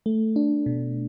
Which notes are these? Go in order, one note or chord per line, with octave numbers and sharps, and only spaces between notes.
A3
D4
B2